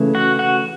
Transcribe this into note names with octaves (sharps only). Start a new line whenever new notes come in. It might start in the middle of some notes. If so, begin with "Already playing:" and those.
Already playing: C#3 E3 A3
F#4 F#5
F#4 F#5